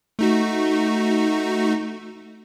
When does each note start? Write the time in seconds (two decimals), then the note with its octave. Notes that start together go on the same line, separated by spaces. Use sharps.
0.19 A3 D#4 F#4